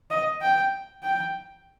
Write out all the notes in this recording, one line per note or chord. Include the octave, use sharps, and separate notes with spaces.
D#5
G5
G5